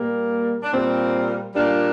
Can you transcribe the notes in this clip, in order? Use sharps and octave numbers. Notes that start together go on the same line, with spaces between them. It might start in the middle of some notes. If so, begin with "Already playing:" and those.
Already playing: A#2 G3 A#3
D4
A#2 G3 A#3 C4
A#2 G3 A#3 D4